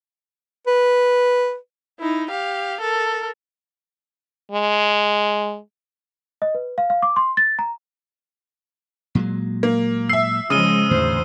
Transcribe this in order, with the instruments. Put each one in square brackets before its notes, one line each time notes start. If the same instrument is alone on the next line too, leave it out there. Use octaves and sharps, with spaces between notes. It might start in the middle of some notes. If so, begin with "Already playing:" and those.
[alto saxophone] B4
[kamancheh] D#4 E4
G4 F5
A4 A#4
[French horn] G#3
[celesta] D#5
B4
F5
F5
D6
C6
A6
A#5
[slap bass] A#2 F#3 G#3
[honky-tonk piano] A#3
[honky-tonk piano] E5 C7 [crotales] E6
[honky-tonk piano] C#3 [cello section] F3 G#3 [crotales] D#6 D#7 G7
[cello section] E2 C5 [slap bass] A2 D3